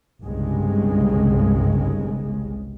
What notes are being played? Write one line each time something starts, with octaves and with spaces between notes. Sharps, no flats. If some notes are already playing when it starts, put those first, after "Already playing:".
G1 C2 G2 C#3 G#3